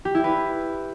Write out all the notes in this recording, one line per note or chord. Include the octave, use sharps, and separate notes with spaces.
G4
E4
B4